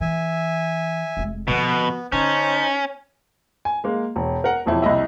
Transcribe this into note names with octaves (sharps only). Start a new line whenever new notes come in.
E3 E5 G#5
F1 G#3
B2 D3 F3 B3
D3 C#4 D#4 C5 A5
G#5
G#3 A#3
E1
A#4 F#5
E1 F2 E4
C2 E4 D#5 E5